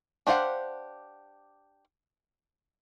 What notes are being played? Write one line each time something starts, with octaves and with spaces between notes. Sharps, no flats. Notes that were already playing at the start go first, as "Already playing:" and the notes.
D4 G4 C5 F5 F#5